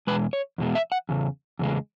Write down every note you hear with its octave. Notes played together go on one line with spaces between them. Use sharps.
E2 B2 G#3 B4
C#5
E2 B2 G#3
E5
F#5
E2 C#3
E2 C#3 G#3